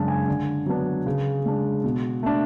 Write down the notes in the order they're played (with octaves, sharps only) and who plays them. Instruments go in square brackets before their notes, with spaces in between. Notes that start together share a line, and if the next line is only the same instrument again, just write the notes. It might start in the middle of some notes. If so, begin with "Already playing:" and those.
Already playing: [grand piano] F#2 C#3 G#3 D4 A5
G#5
D3
F#3 B3 D4
C#3
G#3 D4
B2
A3 D4